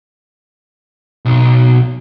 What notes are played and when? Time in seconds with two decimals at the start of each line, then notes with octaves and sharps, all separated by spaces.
1.25 B1